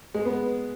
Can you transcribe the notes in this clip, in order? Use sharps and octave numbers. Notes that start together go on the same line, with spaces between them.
G#3
B3